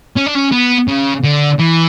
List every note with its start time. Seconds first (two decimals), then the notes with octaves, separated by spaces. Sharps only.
0.16 C#4
0.26 D4
0.35 C#4
0.52 B3
0.88 C#3
1.24 D3
1.59 E3